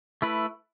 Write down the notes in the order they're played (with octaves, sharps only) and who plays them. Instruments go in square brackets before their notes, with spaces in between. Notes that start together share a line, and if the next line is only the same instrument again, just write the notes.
[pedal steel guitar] A3 E4 B4